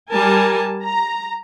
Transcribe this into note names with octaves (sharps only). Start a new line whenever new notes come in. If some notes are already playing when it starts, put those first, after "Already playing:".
G3 A#4 G#5 A5
A#5